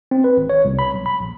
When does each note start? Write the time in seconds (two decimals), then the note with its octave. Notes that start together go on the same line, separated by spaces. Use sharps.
0.11 C4
0.24 B4
0.37 G#1
0.50 C#5
0.65 C2
0.79 B5
0.94 B1
1.06 B5
1.20 A#1